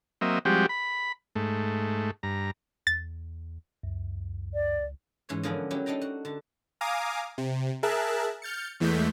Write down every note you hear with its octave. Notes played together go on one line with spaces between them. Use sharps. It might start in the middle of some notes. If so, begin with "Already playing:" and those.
F#3 A#3 C4 D#5 E5
F3 G3 G#3 C4 F#4 G4
B5
G#2 A3
G2 A#5
E2 A6
C#2 F#2
D5
G#2 E3 C#4 C#5
D3 F3 A#3 B3 C#4 G#4
F#3 C#4 E4 G4
D4 D#4 A4 G5 A#5
F#4
D3 A5
F5 G#5 A#5 D6 D#6
C3
G#4 A#4 E5 A5 F#6
F6 G6 A6 C#7
E2 E3 G#3 A3 G6 B6